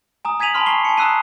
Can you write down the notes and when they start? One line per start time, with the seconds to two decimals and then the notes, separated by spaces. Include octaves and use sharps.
0.25 G#5 A#5 D#6
0.40 G#5 G#6 B6 D#7 F7 F#7
0.54 G#5 A5 B5 C6 F6
0.66 G#5 A#5 C#6 C7 G7
0.85 G#5 A5 C#7
0.97 A#5 D#6 E6 F#6 C7 D#7